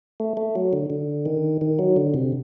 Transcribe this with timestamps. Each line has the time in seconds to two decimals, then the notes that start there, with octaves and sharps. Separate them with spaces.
0.20 A3
0.37 A3
0.55 F#3
0.73 D3
0.90 D3
1.26 D#3
1.61 D#3
1.79 F#3
1.96 D3
2.14 C3